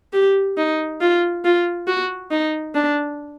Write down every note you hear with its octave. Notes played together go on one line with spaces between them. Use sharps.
G4
D#4
F4
F4
F#4
D#4
D4